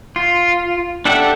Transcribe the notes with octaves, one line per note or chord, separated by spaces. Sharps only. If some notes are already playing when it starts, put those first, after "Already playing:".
F4
D4 G4 A4 E5 F#5